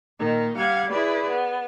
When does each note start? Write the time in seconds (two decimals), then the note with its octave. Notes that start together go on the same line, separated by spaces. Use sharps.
0.18 A#2 D#3 D#4
0.56 G3 F5 F#5 G#6
0.89 E4 G#4 B4 D5
1.29 B3